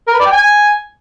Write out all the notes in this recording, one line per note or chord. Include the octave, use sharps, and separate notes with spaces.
A#4
B4
D5
G5
G#5